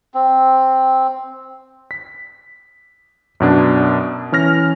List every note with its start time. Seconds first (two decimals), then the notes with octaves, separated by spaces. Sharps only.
0.14 C4
1.91 B6
3.40 F#2 B2 D4
4.32 E3 C#4 F6 A#6